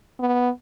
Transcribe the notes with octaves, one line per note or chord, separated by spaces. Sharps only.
B3